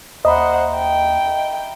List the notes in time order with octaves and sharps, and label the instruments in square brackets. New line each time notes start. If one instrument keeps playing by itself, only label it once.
[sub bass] D#2 [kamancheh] C5 F#5 [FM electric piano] D#5 [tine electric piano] E5 A#5 B5
[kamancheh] G5